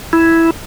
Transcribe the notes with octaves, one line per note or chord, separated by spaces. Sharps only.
E4